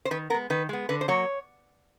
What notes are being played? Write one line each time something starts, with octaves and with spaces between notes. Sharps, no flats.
C5
D#3 B4
G#3 B3 A#4
D#3 B4
G#3 B3
D3 B4
C5
F#3 A#3 C#5